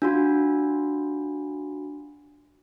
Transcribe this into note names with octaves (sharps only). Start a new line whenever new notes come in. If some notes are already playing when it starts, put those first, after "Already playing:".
D4 F4 F#4